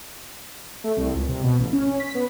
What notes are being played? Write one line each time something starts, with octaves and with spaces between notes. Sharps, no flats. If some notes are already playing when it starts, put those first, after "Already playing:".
A3
C2
C#2
C3
B2
A1
C#4
C#4
B6
B3